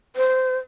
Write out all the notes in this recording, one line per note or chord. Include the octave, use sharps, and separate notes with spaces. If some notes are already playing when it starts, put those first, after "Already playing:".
C5